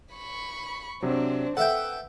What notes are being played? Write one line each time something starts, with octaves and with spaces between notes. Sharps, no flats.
B5 C#6
C3 F#3 C4 D4
A4 B4 E5 F#5 G5